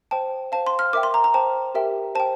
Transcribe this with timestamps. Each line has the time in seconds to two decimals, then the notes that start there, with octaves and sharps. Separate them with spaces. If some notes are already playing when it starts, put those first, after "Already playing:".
0.11 C5 G5 A5
0.52 C5 F5 A5
0.67 C6
0.79 F6
0.93 A#4 E5 G5 D6
1.03 C6
1.14 A#5
1.24 A#5
1.34 C5 G5 A5
1.75 G4 A#4 E5 G5
2.15 C5 G5 A5